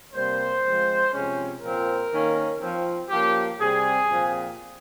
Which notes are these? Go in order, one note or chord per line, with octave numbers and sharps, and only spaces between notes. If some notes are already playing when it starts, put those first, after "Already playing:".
C3 G3 A#3 C5
F3 G#3 C4
C3 F3 G#3 C#4
A#2 F3 C4 A#4
D#3 A#3 C#4
F3 C4
F3 A#3 C#4 G4
C3 G3 C4 G#4
A#2 F3 C4